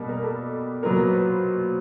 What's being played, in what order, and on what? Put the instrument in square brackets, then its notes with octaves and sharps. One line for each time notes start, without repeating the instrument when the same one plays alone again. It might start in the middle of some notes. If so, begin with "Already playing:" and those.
Already playing: [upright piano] B2 G3 A#3
[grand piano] A#4
A4
[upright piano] A#2 F#3 B3 [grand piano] A#4
[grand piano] B4
C5